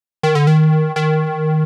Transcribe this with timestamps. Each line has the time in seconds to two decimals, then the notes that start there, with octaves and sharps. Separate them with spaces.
0.23 D#3
0.35 D3
0.47 D#3
0.96 D#3